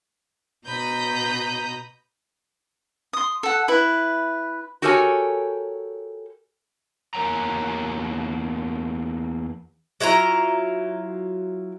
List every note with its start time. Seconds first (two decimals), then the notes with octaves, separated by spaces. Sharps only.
0.66 B2 A#5 B5 D#6 G6
3.13 C6 D#6
3.43 A4 F#5
3.68 E4 B4
4.82 F#4 G4 A4 A#4 C#5 G#5
7.14 E2 A#3 A#4 C#5 G5 A#5
10.00 F#3 E4 F4 A#5